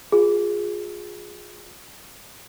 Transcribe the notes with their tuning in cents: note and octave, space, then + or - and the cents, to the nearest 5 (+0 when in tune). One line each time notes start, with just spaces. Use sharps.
F4 +25 G#4 +0